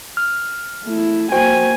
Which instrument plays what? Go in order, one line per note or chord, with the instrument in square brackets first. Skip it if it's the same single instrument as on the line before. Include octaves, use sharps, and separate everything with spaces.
[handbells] F6
[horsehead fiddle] A3 E4
[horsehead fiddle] A#3 G#5 [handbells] F#4 C5 G5